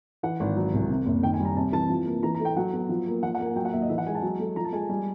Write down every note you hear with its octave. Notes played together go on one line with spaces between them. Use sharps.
E3 F#5
G#1
F#3
C2
C3
F#1
D#3 G5
G#5
G3
A#5
C3 A5
E3 A5
F3
A#3
E3 A#5
A#5
A3
G5
F#3 F#5
B3
F3
A#3
F3 F#5
F#5
A#3 G#5
F#3 G5
F#5
D#2 E5
D#5
E3 E5
F#5
G#3 G#5
A5
F#3
A3
F3 A#5
A5
G#3 G#5
G3 G#5